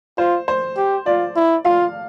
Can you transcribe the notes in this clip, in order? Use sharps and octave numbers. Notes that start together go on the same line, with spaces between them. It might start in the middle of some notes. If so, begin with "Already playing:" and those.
F4 C5
C5
G4
F4 D5
E4
F4 F5